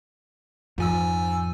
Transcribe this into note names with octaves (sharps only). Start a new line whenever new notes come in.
F2 G#2 F3 G#5 E6